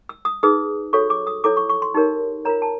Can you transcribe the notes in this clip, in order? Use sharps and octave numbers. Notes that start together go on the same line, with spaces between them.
E6
D#6
D#4 G#4 B4 D#6
F#4 A4 C#5 C#6
D6
D#6
E4 A4 C#5 D6
C#6
C#6
C6
D#4 G4 A#4 C#5
F4 A#4 C#5 A#5
A5